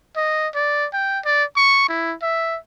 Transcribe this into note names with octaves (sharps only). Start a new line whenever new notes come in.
D#5
D5
G5
D5
C#6
E4
E5